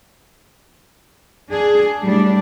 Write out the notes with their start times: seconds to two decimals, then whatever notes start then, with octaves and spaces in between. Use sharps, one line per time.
1.51 D4 G#4
2.03 A2 G3 D4